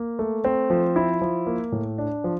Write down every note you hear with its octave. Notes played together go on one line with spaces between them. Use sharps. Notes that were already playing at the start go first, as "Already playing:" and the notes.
Already playing: A#3
A3
C4
F3
E4
F3
A#3
A2
D4
F3